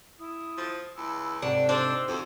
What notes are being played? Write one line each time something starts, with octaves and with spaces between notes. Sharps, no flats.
E4 D#6
F3
C#2 E4 B5 E6
G#2 C3 D4 A4 F#5 C#6
D4 D#4 G4 C5 E6
F2 F#4 A4 C5